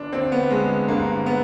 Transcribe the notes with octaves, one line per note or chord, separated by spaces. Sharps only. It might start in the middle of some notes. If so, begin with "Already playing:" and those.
Already playing: G1 D4
G2 D3 C4
B3
G1 G#3
G2 D3 A#3
B3